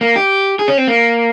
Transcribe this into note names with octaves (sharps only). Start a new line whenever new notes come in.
A#3
G4
G#4
C#4
C4
A#3